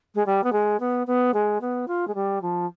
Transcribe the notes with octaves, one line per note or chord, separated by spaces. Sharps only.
G#3
G3
B3
G#3
B3
B3
G#3
B3
F4
G#3
G3
F3